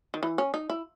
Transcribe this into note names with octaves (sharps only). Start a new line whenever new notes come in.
D#3
E3
C#4
D#4
E4